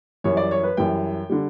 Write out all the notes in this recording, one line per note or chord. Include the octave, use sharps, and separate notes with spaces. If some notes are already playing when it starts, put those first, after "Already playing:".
F#2 E3 G3 C#5
D5
C#5
B4
F#2 E3 G3 G5
D3 G3